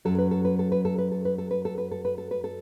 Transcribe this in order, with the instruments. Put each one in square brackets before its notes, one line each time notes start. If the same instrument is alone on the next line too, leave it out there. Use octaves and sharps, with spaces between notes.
[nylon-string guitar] F#2 F#3 A4
B4
A4
B4
A4
B4
A4
B4
A4
B4
A4
B4
A4
B4
A4
B4
A4
B4
A4